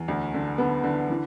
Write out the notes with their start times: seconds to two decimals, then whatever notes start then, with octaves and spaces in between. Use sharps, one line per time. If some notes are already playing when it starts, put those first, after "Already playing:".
Already playing: E2
0.08 D2
0.34 D3
0.58 D3 B3
0.84 D3
1.10 E3